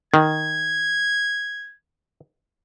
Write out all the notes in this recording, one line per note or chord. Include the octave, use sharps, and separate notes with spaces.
D#3 G#6